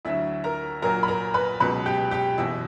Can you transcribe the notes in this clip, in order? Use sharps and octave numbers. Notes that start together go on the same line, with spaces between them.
D2 D3 F#3 E4 E5
A#4 A#5
A#1 A#2 F#3 A#4 A#5
B5
A#4 A#5
B4 B5
C#2 B2 F#3 B4 B5
G4 G5
G4 G5
F#1 E2 B2 E4 E5